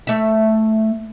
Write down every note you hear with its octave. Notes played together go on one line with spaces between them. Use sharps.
A3 E5